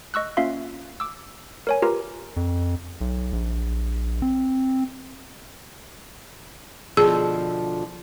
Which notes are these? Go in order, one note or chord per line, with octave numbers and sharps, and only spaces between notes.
D#5 C#6 E6 F#6
A#3 C#4 F4 E5 F5 C6
D6 E6
A#4 C#5 G#5
F4 G4 A#4 B4 A#5
F2
B1
A#1
C4
B2 D3 F3 G#4